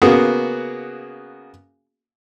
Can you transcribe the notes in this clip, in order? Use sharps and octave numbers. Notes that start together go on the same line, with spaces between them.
C#3 A#3 B3 F#4 G#4